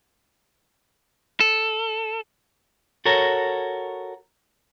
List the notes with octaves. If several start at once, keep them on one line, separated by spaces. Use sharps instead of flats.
A4
F#4 A4 A#4 C#5